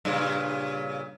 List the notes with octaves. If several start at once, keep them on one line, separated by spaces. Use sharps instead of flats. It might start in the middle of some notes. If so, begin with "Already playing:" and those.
G2 A#2 C#3